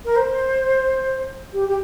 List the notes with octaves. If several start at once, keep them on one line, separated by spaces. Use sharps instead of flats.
A#4
C5
G4
G4